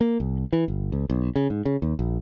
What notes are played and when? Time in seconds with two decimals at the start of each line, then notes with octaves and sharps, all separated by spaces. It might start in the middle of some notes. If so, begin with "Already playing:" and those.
0.01 A#3
0.20 C2
0.53 E3
0.68 G1
0.92 C#2
1.10 B1
1.36 C#3
1.50 G#2
1.65 C#3
1.82 D#2
1.99 A#1